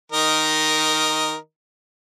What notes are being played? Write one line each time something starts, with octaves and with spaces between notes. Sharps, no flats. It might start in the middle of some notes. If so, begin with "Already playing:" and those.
D#3 A#4 D#5